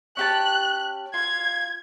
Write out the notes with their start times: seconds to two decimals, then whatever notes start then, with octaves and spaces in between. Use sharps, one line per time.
0.17 C#4 G4 A5 F#6
1.14 F4 G#6